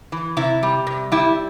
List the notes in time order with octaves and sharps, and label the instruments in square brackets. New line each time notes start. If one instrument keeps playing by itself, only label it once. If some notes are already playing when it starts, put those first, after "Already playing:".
[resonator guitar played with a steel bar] E3
C3 E4
G3
C3
G3 E4